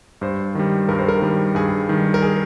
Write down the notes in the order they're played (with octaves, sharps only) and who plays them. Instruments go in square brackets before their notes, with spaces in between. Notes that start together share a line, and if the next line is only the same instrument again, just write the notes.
[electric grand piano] G2 [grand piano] C5
[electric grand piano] D#3 G3
[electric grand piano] G2 [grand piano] A#4
[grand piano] C5
A#4
[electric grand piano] D#3 G3
[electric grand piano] G2 [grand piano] G#4
[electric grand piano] D#3 G3
[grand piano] A#4
G#4